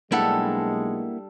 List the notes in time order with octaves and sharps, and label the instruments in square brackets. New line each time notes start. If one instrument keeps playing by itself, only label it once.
[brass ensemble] B1 G#3 [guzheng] G3 D4 A4 [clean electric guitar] A#3 E4 F#5